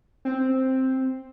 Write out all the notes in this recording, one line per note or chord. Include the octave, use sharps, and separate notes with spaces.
C4